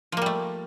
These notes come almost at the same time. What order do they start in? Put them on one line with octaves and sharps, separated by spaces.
F3 A#3 G3 A3